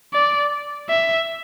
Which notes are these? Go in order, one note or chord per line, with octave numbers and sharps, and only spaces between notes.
D5
E5